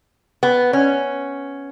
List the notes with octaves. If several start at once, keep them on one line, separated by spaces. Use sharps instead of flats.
B3
C#4